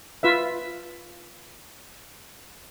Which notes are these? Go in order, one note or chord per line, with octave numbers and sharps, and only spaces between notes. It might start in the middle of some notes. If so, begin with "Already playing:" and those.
F4 B4 E5